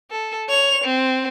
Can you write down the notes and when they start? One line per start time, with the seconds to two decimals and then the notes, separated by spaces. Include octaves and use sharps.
0.11 A4
0.48 C#5 F7
0.84 C4